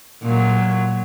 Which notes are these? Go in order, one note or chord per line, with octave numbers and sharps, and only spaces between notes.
A#2 F#3